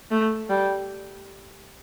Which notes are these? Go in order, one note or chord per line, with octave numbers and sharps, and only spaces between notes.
A3
G3